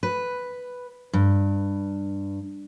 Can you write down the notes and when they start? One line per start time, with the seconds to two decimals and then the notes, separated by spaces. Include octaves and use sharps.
0.03 B4
1.13 G2